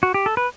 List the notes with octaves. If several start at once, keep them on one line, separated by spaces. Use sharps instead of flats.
F#4
G4
A4
B4